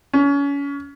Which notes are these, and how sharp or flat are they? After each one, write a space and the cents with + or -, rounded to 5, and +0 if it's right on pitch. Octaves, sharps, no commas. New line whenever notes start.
C#4 +30